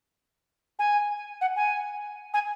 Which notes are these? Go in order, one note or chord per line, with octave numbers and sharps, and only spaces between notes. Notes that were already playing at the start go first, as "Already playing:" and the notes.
G#5
F#5
G#5
G#5